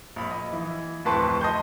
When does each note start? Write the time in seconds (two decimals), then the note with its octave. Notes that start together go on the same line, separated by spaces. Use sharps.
0.16 A#1 B5
0.31 D#5
0.52 E3
1.05 D1 F2 B4 A5 C6 C#6
1.41 D#5 A5 C6 G6